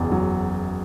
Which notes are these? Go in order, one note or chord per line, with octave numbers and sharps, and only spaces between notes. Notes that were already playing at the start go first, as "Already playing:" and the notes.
Already playing: F#1 E2
F#3